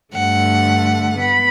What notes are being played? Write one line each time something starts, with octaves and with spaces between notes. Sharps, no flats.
G2 D3 A3 F#5
B3 B5